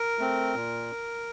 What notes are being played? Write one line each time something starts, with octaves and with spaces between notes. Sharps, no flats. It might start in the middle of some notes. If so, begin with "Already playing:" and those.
Already playing: A#4
A3 C4
A#2